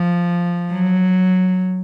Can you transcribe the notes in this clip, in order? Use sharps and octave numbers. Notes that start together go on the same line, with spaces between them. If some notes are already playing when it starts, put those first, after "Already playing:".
Already playing: F3
F#3